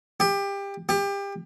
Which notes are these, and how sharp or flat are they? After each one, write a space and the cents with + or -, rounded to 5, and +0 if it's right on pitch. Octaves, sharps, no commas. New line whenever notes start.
G4 +25
G4 +30